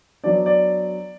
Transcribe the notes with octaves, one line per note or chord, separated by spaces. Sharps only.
F#3 B3 D4 D5
D5